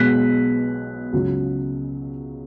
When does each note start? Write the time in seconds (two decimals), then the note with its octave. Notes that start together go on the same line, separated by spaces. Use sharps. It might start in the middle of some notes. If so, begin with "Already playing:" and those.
Already playing: B1 B2 G#3 F#6 B6
1.13 C#2 C#3 F#3